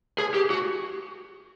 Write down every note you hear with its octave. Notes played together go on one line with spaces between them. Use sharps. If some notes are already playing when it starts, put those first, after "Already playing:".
G#4
G4
F#4